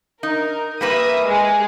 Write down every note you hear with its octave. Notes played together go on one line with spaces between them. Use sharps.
D#4 A#4
G3 A#3 B4 E5 D#6
G#3 G#4